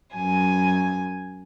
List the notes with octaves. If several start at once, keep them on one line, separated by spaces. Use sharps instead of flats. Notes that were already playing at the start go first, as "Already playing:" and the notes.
F#2 G#5